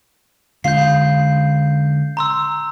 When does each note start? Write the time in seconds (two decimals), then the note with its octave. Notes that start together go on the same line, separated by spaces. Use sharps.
0.64 D3 G#3 C#4 F4 G6 C7
2.17 A#5 C6 E6